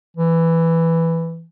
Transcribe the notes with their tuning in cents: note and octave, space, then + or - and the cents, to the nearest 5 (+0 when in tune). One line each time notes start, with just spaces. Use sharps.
E3 +5